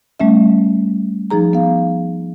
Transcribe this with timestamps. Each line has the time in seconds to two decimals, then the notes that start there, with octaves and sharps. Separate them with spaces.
0.20 G3 A3 C#4 E5
1.30 F3 D#4 G#4 A#5
1.53 B3 F5